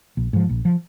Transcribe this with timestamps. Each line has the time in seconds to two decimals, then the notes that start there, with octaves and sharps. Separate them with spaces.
0.17 A#1
0.33 G#2 F3
0.49 A#1
0.65 F3